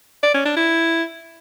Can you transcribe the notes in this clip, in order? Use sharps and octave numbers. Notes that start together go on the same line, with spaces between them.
D5
C#4
D4
E4